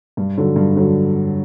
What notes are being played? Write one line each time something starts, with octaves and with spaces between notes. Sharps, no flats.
G2
D3 F#3
G2
D3 F#3